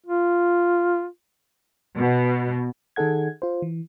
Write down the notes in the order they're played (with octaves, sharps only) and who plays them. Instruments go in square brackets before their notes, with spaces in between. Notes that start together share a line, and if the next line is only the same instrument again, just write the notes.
[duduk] F4
[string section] B2
[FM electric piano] D#3 D#4 G#4 A4 F#5 G#6
F4 C5
E3